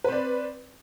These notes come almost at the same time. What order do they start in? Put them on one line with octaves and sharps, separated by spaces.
B4 C4 D5